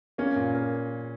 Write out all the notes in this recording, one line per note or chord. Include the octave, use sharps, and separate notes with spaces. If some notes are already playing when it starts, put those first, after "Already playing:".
A#3 C#4
A#2
A#3